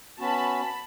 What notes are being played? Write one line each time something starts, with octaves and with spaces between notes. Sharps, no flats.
B3 C#4 F#4 A5 B5